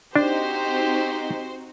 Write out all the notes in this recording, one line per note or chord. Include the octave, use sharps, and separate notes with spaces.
C4 D4 D#4 F#4 G4 C5